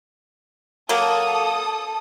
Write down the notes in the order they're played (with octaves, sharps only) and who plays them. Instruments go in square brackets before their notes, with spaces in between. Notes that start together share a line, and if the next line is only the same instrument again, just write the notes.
[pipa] F#3 A#3 [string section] A4 D#6